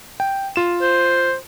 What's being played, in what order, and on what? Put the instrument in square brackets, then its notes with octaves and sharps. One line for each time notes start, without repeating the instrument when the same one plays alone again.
[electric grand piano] G5
F4 E7
[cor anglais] C5